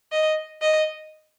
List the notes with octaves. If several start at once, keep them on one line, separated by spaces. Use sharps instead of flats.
D#5
D#5